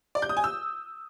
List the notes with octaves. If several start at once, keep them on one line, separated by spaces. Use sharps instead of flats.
D5
G6
D#6
G#5
E6